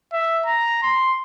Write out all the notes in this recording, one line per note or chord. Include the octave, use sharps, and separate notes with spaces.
E5
A#5
C6